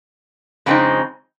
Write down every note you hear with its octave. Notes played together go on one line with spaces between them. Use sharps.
F2 C#3 G#3 C4 D#4